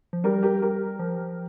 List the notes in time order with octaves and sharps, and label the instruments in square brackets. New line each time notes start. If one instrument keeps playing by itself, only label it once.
[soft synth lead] F3
[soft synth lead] G3 [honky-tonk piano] G4 A#4
[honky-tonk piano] G4 A#4
G4 A#4
[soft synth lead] F3